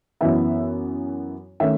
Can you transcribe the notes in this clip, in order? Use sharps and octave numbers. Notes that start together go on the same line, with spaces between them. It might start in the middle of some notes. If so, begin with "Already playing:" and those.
F#2 E3 B3 E5
D#3 A3 C#4 E5